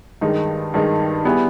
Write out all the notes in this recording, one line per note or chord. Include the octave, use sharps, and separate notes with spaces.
G2 D#3 G#3 D#4
G2 D#3 G#3 D#4
G3 B3 E4 G#4